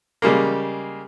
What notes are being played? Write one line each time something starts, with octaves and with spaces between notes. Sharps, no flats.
C#3 G3 G#3 A#3